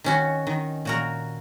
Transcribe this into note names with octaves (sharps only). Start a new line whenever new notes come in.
D#3 C#4 F#4
D#3
A#2 F#4 A#4